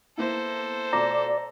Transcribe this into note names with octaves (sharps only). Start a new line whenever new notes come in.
A#3 B3 E4 A4 C5
B2 A3 F4 D5 A#5 A#6